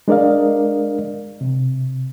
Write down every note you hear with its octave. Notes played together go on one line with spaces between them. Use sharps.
G#3 D4 A#4 D5 D#5 F5
C3